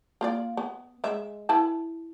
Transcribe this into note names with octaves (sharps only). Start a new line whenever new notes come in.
A#3 F4 D5
B3
G#3 E5
E4 B4 A5